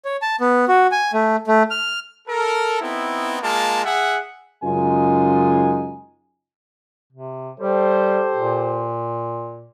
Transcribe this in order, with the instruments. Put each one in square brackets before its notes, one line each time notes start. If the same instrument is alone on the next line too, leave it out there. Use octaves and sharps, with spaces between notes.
[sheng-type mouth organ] C#5
A5
B3
F#4
G#5
A3
A3
F6
[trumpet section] A4 A#4
B3 C4 D#4 E4
G#3 A#3 F4 A5
G#4 E5 F#5
[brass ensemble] F#2 C#3 G#3 D#4 F4 G#5
[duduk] C3
[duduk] G3 [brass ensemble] G4 A4 C5
[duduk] A#2